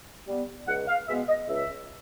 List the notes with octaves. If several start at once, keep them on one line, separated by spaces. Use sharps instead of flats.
G3 B3
C#2 F#5
F5
B2 G#3 B3 E5
D#5
C#2 E5